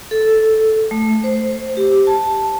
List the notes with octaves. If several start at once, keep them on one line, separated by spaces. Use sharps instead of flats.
A4
A3
C5
G4
A5